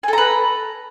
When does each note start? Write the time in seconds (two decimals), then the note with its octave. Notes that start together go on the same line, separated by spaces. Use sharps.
0.03 G#5
0.08 A4
0.13 A#5
0.18 B4